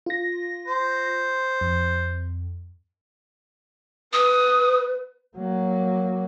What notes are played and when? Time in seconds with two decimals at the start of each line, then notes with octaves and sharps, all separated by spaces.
0.06 F4 A#6
0.67 C5
1.61 F2
4.13 B4 D#6
5.37 F#3 A#3